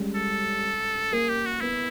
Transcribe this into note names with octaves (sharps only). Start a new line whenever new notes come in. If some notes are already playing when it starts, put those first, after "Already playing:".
Already playing: G3 G#3 C#4
A4
A#3 G#4
G4
F#4
B3 E4